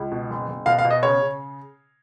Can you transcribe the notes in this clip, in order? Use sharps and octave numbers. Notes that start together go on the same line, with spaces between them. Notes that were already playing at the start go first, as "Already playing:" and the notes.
Already playing: C#2
B2
F#1
F#1
B2 F5
F5
B2
D#5
C#3 C#5
C#3